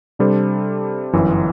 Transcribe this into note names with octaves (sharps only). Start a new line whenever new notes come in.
C3 G3 D4 A4 C5
G1 F#2 E3